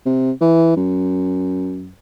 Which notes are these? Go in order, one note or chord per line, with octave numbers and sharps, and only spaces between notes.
C3
E3
F#2